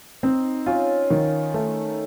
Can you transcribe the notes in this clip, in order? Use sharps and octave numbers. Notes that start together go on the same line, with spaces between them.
C4 D#4
C#4 F4
D#3
A3